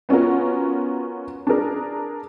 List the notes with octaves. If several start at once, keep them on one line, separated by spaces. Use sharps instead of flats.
B3 C#4 F4 F#4 A#4
D4 G#4 A#4